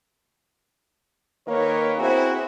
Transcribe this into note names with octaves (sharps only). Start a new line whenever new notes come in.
D#3 A#3 A#4 B4 C#5
B3 C4 E4 F#4 G#4 C5